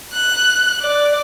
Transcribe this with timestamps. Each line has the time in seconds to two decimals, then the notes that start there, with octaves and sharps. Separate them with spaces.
0.14 F#6
0.82 D5